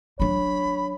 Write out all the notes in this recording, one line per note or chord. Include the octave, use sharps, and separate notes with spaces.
F#3 D4 C#5 B5